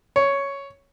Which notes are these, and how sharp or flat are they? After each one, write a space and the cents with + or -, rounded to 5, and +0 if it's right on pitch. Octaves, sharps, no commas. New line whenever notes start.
C#5 +5